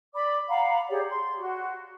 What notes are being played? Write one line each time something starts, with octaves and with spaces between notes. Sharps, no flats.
D5 B5 D6
F5 F#5 A#5 B5
G4 G#4 C#5 D5
C6
F#4